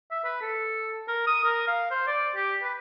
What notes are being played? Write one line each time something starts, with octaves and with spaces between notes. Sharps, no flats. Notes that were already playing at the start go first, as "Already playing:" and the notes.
E5
B4
A4
A#4
D#6
A#4
F5
C5
D5
G4
B4